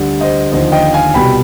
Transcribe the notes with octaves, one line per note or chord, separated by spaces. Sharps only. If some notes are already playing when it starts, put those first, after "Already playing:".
Already playing: D2 D3 G3
C5 D#5
D#2 D3 F3 C5 D#5
D#5 G5
F5 G#5
C2 B2 G3 G5 B5